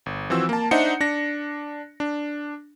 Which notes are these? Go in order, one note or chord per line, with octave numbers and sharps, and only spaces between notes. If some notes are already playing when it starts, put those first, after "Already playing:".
G1
E3 F3 C4 F#4 E6
A#3 A5
D4 D#4 C5 E5 F#5 C#7
D4 A#6
D4